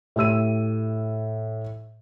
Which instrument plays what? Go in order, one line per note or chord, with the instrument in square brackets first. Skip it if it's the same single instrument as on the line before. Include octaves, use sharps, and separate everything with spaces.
[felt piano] A2 G4 E6 D#7